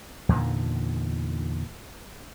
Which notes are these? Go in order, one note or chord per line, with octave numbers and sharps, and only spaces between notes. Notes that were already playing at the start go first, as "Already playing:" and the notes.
E2 A#2 D3 D#3